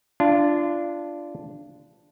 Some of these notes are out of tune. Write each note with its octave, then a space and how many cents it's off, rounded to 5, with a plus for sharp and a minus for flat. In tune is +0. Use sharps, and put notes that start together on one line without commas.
D4 +0 F4 -25